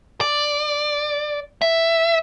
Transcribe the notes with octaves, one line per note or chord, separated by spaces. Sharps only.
D5
E5